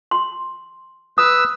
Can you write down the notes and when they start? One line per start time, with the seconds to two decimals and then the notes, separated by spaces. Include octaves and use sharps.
0.11 C6
1.18 B4 D#6 E6